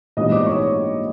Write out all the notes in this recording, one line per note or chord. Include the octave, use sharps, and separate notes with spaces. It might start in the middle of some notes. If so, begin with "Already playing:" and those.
A#1 G#2 E3 G3 B3 D#5 D#6
D5 D6
C#5 C#6